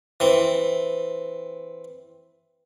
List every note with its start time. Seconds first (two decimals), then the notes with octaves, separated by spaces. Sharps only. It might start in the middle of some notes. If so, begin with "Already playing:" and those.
0.20 E3 C4